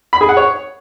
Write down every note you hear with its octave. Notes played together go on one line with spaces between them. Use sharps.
B5
G#4
F#5
C#5